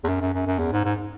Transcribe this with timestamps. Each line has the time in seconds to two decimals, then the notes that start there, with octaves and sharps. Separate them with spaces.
0.04 E2
0.09 F#2
0.21 F#2
0.34 F#2
0.47 F#2
0.59 E2
0.72 G#2
0.85 G#2